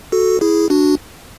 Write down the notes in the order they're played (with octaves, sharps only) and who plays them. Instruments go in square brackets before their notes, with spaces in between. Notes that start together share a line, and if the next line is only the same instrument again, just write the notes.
[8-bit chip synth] F#4 A4
E4 G#4
D4 F#4